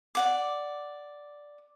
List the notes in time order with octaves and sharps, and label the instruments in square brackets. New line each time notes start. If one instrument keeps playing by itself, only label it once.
[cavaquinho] D5 F#5 D6